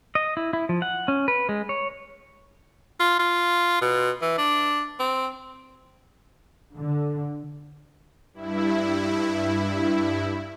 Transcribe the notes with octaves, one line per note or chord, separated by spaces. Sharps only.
D#5
E4
E4
F3
F#5
C#4
B4
G#3
C#5
F4
F4
B2
E3
D4
C4
D3
G2 E4